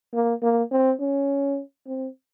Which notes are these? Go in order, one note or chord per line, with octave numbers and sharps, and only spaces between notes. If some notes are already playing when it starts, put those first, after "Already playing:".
A#3
A#3
C4
C#4
C4